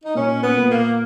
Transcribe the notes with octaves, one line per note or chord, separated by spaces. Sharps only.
D#4
A#2 C#4
B3
A#2
A#3